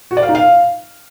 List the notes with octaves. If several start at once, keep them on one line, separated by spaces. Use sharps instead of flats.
F#4
D5
F5
D#4
F5